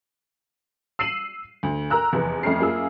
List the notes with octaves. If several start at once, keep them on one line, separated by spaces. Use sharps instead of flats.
E6 C7 D#7 E7 F#7
D2
A#4 A#5 E6 F#6
F1 E2 B3
F2 A3 C#4 F6 C7
F#2 A#3 F4 G#4 E6